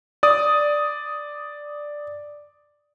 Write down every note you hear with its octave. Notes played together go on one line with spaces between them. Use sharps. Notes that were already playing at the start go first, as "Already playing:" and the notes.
D5 D#6